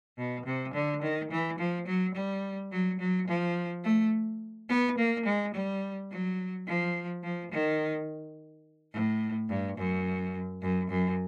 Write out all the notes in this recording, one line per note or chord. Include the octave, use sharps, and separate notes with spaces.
B2
C3
D3
D#3
E3
F3
F#3
G3
F#3
F#3
F3
A3
B3
A#3
G#3
G3
F#3
F3
F3
D#3
A2
G2
F#2
F#2
F#2